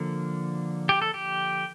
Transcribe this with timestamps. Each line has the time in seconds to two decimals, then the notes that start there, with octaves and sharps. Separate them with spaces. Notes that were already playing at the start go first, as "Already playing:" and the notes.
Already playing: D3 F3 A#3
0.89 G4
1.02 A4
1.14 G4